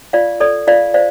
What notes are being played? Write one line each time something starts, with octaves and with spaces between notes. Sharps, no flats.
F4 D5 F5
A4 D5
F4 D5 F5
C5 D5 F5